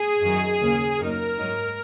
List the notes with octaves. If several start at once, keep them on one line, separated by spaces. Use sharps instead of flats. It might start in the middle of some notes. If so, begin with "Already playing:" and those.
Already playing: G#4
F#2 D#3 F#3 D#4
D#2 C#3 A#3
F#2 F#3 A#3 D#4 A#4
G#2 F#3 D#4